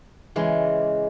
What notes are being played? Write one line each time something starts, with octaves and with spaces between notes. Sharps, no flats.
C#3 E3 G#3